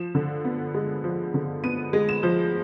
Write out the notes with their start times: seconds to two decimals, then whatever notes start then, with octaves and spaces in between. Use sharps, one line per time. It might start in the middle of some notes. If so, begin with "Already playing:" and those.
Already playing: F3 E7
0.15 D3
0.45 B3
0.74 G#3
1.04 F3
1.34 D3
1.64 B3 D#7
1.93 G#3
2.09 E7
2.23 F3